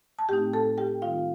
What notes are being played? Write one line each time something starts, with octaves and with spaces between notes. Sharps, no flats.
A5
A2 A3 C4 D#4 G4 G5
A4 A5
G4 G5
D#3 G3 C4 D#4 F4 F5